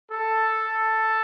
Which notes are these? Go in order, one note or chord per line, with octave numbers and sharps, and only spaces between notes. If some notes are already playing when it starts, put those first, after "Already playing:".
A4